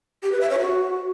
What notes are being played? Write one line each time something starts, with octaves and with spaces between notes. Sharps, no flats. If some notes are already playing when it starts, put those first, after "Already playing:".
G4
B4
E5
C#5
F#4